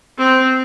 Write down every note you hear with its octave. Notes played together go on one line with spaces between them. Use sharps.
C4